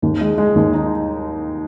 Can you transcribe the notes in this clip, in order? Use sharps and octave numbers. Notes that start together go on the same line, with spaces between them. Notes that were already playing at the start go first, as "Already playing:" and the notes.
D#2
G#3
G#3
D#2
D#4